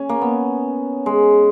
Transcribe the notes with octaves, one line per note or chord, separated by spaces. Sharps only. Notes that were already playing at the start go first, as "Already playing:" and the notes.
Already playing: C#4
A#3
B3
G#3